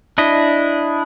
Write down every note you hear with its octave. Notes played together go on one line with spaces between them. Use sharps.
D4 E4 D#5